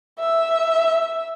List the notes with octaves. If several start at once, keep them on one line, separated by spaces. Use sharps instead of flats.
E5